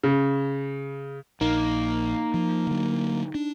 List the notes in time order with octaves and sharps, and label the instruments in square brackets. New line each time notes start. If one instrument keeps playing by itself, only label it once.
[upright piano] C#3
[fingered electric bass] A#1 [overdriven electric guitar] A#3 [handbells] D#4
[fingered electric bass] F3
D3 F#3
D4